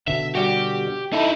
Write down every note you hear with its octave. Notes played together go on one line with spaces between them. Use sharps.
B2 D3 E5
G3 F#4 G4
D#4 E4 A4